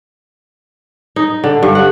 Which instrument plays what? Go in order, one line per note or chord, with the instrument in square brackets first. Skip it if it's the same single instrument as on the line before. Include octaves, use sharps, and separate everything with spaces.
[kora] D#4
D3
G2
F#5